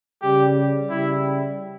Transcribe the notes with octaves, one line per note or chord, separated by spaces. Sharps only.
C#3 G3 G4
C#3 G3 E4